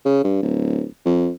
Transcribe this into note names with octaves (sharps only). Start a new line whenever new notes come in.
C#3
G2
D1
F2